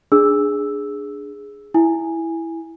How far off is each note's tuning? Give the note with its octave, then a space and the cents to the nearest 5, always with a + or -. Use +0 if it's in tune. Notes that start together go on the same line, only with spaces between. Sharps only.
D4 +0 G#4 +0 E6 +0
E4 +0 G#5 -10